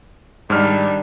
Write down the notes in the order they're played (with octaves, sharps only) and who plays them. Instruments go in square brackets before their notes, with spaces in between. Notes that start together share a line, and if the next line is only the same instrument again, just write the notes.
[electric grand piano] G#2 F6 [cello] D#3 G3 [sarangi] D4